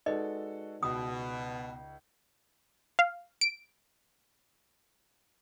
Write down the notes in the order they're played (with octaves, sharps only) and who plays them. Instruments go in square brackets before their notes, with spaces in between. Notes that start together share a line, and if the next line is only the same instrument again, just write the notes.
[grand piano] G#3 F#4 A4 [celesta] D#4 B4 D5 [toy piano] D#5
[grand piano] C#2 [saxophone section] B2 [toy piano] D#6
[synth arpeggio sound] F5
D7